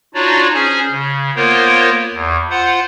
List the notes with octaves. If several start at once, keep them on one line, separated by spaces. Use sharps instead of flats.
D4 D#4 F4 F#4 C#5 D5
C#4 G#4 C5 G#5
C#3
A#3 B3 F4 A#4 C5 C#5
E2
F4 C5 F#5